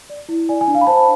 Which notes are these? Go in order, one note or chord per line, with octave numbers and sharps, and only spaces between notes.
D5
E4
D5 G#5
G#5
D4
F5
B5
C5 A5